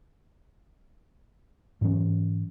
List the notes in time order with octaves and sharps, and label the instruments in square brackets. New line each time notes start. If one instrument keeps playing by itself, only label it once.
[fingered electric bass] G#2 E3 F#3 C#4